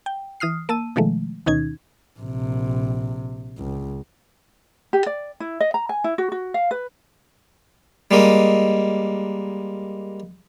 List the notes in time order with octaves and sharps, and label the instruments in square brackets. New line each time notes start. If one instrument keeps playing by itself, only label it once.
[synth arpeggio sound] G5
E3 D#6 F6 C7
A#3 A5 E6 D#7
B2 D#3 F3 G#3 A3
D2 B2 D#3 C#4 D#4 G#6
[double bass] A#1 C3
C#2
[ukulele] G4
D5
E4
D#5
A#5
G#5
E4
F#4
F#4
F5
B4
[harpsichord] G3 G#3 A#3 D#5